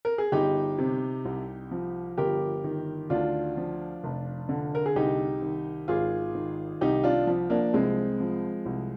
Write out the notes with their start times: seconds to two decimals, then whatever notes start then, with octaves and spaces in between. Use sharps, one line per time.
0.05 A#4
0.18 G#4
0.32 G1 D#4 G4
0.78 C3
1.25 C2
1.71 F3
2.18 G1 G4 A#4
2.64 D#3
3.10 D2 D4 F4
3.57 F3
4.04 F1
4.49 D3
4.75 A#4
4.86 G#4
4.96 C2 D#4 G4
5.42 D#3
5.88 G#1 F4 G#4
6.35 D#3
6.81 C2 D#4 G4
7.04 D4 F4
7.27 F3
7.50 A#3 D4
7.74 C2 G#3 C4
8.20 F3
8.66 C2